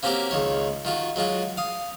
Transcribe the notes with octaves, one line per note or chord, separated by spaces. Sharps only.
A#3 C4 C#4 F#4 G4 A#4
C#2 D#3 C#5
D#3 F4 F#4
F#3 G#3 F4 F#4
F5 D#6